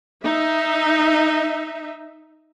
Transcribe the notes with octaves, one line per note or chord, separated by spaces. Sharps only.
D#4 E5